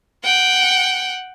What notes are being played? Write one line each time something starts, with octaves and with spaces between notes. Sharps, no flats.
F#5 G5